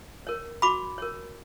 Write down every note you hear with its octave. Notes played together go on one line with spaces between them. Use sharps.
A#4 C#5
F#4 B5 D6
A#4 C#5